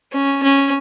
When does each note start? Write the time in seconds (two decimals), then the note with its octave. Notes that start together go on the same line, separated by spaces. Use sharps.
0.13 C#4
0.43 C#4